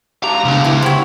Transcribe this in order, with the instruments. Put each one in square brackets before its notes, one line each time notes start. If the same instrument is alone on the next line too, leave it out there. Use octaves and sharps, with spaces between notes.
[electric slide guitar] G4 F5 A5 [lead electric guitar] A#5
[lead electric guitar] C#2 B2 [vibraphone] B3 D4
[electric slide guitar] E2 E3 [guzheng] E4
[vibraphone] G3 G4 F#5 [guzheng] C4 C#5 [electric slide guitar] E4